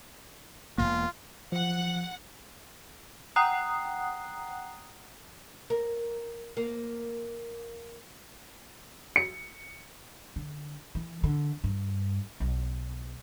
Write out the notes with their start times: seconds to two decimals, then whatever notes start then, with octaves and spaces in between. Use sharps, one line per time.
0.78 E1 E2 A#3 F4
1.52 F3 F#5
3.36 F#5 G5 A#5 D#6 F#6 C7
5.70 A#4
6.57 A#3
9.16 C#7
10.36 D3
10.95 E3
11.24 D3
11.64 G2
12.40 B1